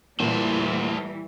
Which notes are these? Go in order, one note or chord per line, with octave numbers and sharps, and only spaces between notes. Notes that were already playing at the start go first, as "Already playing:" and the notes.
A#2 E3 G3 A3 C5